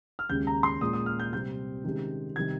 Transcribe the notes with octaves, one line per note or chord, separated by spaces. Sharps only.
F6
D#2 C#3 G#3 C#4 G6
A#5
C6
A#2 G#3 C#4 D#6
D#6
F6
G6
C3 G3 C4 G6
C3 D#3 G#3 C#4
C3 D#3 G3 G#6